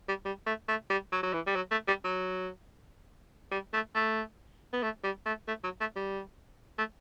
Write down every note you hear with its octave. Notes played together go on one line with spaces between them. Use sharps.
G3
G3
A3
A3
G3
F#3
F#3
E3
G3
F#3
A3
G3
F#3
G3
A3
A3
B3
A3
G3
A3
A3
F#3
A3
G3
A3